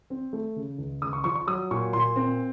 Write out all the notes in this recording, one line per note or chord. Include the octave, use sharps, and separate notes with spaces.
C4
A3
C#3
C#2
C#2 D#6
C#6
F3 C#6
C#6
F#3 D#6
A#2 C#6
A#2 C6
C4